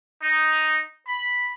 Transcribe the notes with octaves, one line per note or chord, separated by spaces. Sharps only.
D#4
B5